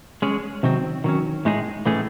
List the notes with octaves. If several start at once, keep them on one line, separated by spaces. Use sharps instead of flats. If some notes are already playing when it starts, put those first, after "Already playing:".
G#3 C#4 G#4
C3 D#3 F#3 C4
D#3 F#3 C#4
A2 G#3 D#4 G#4
A2 E3 A3 C#4 G#4